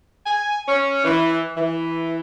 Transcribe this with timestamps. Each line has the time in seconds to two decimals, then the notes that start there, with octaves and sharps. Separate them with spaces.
0.25 G#5
0.68 C#4
1.05 E3
1.56 E3